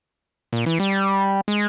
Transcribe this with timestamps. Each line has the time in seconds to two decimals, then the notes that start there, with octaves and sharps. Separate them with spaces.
0.53 A#2
0.66 E3
0.80 G3
1.48 G#3